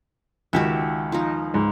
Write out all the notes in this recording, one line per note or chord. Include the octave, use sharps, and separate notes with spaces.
C#2 D#3 F#4 G4 E5
F3 D#4
C#2 G#2